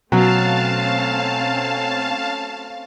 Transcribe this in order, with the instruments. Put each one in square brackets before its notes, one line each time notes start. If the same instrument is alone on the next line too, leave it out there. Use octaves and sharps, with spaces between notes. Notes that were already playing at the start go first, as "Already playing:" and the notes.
[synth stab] B2 [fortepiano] F#3 [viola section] A3 C4 C#4 [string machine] F5 A5